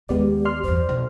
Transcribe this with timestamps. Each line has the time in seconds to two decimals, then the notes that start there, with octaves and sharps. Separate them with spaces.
0.09 D#2 D#3 G#3 B3 G4 D5
0.45 D5 C6 F6
0.64 E2 G2 C5
0.89 B1 B2